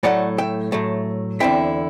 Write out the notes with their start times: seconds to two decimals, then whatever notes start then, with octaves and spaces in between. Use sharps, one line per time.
0.03 A2 F#3 A3 D5 F#5
0.38 E5 G5
0.72 A2 F#3 A3
1.40 E2 D3 A3 C4 E4 E5 G5